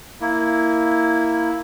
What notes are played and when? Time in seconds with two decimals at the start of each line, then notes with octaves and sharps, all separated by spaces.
0.21 A#3 E4